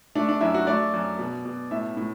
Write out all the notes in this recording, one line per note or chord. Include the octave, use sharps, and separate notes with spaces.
A3 D4
D4
F#2 E4
F#4
A3 D5
F#2
B2
B2
A2 E5
A2